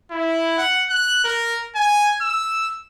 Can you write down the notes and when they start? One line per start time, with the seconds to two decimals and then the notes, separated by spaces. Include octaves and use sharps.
0.11 E4
0.58 F#5
0.90 F#6
1.24 A#4
1.76 G#5
2.22 E6